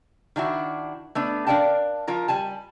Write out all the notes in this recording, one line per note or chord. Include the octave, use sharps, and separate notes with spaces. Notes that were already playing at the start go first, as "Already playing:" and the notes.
D#3 D4 E4 F#4
A3 B3 D4
D4 A#4 D5 F5 G5 A5
F3 F4 A#4 A#5
G3 G#5 A5